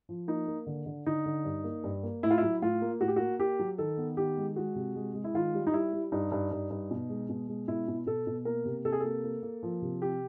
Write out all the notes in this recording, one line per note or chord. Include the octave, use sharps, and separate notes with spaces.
F3
A#3 D#4
A#3
D3
D3
D3 D#4
D3
G2
A#3
G2
A#3
A2 E4
F4
F#3 E4
A2 F4
A#3
A2 F#4
G4
A#3 F#4
A#3 G4
F#3
D#3 A4
B3
D#3 G4
G#3
G#3 F#4
C3
G#3
G#3
E4
D#3 F4
G3
D#4
G3 E4
G3
G2 D#4
G2
G2
G2
B2
G#3
B2
G#3
B2 E4
B2
B2 A4
B2
A#3 A#4
C3
C3 A4
G#4
A#3 A4
A#3
A#3
F3
C3
C4 G4